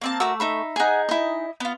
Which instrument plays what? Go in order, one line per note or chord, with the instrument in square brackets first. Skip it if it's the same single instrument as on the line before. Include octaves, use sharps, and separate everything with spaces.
[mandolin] A#3 C4 A5
[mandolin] A3 E6 [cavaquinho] F#4 A#4 D6
[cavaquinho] D#4 E5 B5
[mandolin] D#4 G#4 [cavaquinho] F#5 G#5
[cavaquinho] E4 D#5
[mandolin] B3 F4